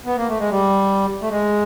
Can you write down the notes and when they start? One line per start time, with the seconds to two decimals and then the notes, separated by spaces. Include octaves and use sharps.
0.06 B3
0.17 A#3
0.28 A3
0.39 G#3
0.50 G3
1.22 A3
1.30 G#3